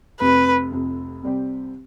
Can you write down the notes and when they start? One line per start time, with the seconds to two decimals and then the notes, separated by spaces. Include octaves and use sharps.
0.20 F1 F2 C3 B4
0.71 F1 F2 C3
1.23 C2 C3 G3 C4 G4